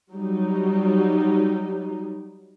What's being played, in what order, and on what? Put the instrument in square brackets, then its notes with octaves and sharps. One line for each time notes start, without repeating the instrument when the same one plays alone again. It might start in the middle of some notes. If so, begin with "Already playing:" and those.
[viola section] F#3 G3 D#4